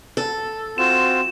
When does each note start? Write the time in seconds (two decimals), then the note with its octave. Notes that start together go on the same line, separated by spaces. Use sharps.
0.17 A4
0.78 C4 F4 F#4 E7